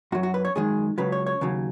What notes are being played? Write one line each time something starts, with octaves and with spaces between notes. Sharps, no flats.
F#2 F#3 F#4
F#4
B4
C#5
F#2 D#3 G#3 G#4
C#2 C#3 F#3 B4
C#5
C#5
D#2 C#3 F#3